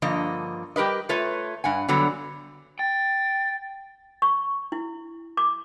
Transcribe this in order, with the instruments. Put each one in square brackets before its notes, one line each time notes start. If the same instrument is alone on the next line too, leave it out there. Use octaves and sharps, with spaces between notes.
[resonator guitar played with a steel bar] G2 D3 F3 A#3 D#5
G3 G4 A#4 B4 D#5
A3 F4 B4 C#5
G2 F#5 G#5
D3 F#3 G3 B3
[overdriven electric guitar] G5 [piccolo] A6
[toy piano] C#6
E4
D6